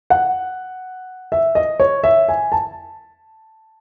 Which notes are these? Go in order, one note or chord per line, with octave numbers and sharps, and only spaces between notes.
F#5
E5
D#5
C#5
E5
G#5
A5